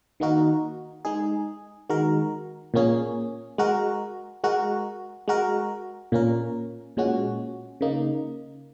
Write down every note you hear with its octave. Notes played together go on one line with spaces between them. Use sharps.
D#3 A#3 D#4 F#4 A#4
G#3 D#4 G#4
D#3 G#3 F#4 A#4
A#2 A#3 C#4 G#4
G#3 F#4 A#4
G#3 F#4 A#4
G#3 F#4 A#4
A#2 A#3 C#4 A#4
A#2 G#3 C#4 F#4
C#3 A#3 D#4